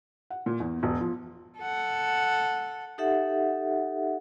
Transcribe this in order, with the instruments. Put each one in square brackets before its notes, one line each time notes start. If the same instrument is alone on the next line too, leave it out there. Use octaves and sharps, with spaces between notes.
[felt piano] F#5
A#2
E2
E1
F3
[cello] A4 F#5
[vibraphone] D#4 G4 A4 E5 F#5